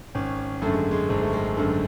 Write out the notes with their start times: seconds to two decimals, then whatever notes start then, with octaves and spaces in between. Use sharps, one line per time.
0.15 G#1 C#4
0.62 F#2 D3 A3
0.73 G#3
0.91 G#3
1.09 G#1 G#3
1.21 A3
1.33 G#3
1.57 F#2 D3 A3